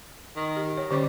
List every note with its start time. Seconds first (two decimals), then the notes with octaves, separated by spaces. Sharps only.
0.36 D#3
0.57 G4
0.78 C#5
0.91 D3 G3 C#4 D6